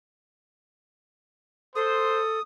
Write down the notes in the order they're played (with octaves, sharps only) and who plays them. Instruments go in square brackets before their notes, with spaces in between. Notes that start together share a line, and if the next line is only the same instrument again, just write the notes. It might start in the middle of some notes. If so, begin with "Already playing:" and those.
[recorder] A4 [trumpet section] C5 [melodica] D#6